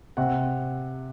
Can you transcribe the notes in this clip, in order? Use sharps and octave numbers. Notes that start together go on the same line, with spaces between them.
C3 F#5